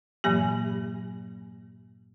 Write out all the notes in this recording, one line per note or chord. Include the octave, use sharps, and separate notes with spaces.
G2 A#2 E3 F#3 A#3 G4